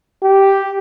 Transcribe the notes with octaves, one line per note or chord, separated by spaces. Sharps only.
G4